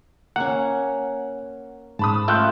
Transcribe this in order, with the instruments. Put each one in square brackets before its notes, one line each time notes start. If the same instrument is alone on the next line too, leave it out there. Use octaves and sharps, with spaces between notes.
[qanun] A#3 C#4 [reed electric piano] F#5
[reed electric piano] G#2 [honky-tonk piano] A5 B5 D#6
[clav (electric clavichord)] A3 F4 G5 [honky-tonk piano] E6 F#6 G6